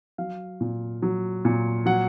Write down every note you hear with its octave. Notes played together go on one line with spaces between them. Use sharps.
F#3 F5
A#2
F#3
A#2
F#3 F#5